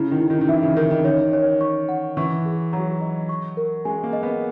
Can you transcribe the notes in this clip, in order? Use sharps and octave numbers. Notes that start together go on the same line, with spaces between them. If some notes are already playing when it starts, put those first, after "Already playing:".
Already playing: C#3 E4
D#3
E4
D#3
D#3
E3 E5
C#3
D#3 A#4
D#3
D#3 C#5
C#5
C#6
F#5
E3 C#6
G#4
F#3 A#5
D#5
C#6
A#4
G#3 G#5
A#3
D#5
B3